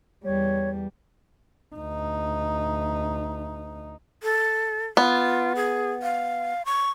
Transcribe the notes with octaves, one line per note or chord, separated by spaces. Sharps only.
E2 G3 C#5
D2 D#4
A4
B3 F4
G#4
F5
C#6